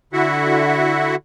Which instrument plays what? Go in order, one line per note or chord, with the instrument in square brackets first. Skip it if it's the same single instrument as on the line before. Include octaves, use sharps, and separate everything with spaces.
[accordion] D3 E4 F#4 E5 F#5